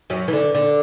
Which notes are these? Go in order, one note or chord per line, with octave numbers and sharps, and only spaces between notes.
F#2 F#3
E3
D3
D3